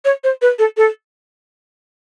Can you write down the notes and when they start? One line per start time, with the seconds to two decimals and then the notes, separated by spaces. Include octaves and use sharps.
0.05 C#5
0.24 C5
0.42 B4
0.59 A4
0.77 A4